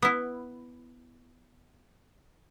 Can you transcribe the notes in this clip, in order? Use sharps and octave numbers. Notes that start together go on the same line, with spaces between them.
B3 E4